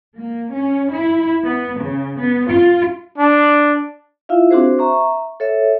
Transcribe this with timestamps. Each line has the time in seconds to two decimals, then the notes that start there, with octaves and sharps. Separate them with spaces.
0.16 A#3
0.51 C#4
0.94 E4
1.44 B3
1.79 C#3
2.17 B3
2.47 F4
3.18 D4
4.29 E4 F4 E5 F5
4.51 C4 D4 F#4 G#4 C5
4.79 E5 A#5 C#6
5.40 A4 C#5 E5